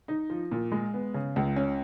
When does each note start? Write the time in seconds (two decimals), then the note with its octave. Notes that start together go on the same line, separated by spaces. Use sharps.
0.08 D#4
0.30 F3
0.52 A#2
0.72 G#3
0.94 B3
1.14 C#3
1.36 C#2
1.56 C#4